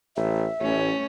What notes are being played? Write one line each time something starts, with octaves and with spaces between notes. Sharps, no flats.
A1 E5
A1 A3 C#4